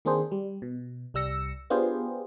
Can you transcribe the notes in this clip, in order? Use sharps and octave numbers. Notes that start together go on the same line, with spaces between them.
D#3 A#3 C4 D4 G#4 C5
G3
B2
C2 G3 E6 A#6 C#7
B3 D4 F4 G4 G#4 C5